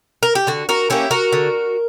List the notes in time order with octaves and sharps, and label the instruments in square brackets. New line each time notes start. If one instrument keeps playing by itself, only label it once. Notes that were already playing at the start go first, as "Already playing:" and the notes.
[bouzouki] A#4
G4
D3 F#4
F#4 A#4
A#3 C#4 E4 G4
F#4 A#4
D3